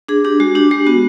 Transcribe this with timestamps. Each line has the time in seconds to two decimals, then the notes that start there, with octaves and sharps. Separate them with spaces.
0.08 D4 G#4
0.25 D4 G4
0.40 G#3 F#4
0.55 D4 G4
0.71 G#3 G4
0.86 B3 F#4